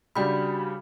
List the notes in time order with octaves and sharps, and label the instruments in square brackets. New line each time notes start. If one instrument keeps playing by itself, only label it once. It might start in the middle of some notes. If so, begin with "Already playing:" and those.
[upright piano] C#3 G3 D4 [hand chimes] F#4 G5 B5